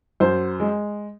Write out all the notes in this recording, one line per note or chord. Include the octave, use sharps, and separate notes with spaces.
F#2 C5
G#3